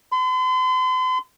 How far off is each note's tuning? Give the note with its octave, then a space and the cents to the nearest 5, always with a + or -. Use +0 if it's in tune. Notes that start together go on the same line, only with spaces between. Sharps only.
C6 -45